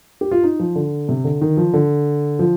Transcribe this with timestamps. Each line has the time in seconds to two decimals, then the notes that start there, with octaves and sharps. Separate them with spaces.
0.21 G4
0.31 F4
0.43 D#4
0.59 F3
0.75 D3
1.09 C3
1.24 D3
1.41 D#3
1.57 F3
1.73 D3
2.39 F3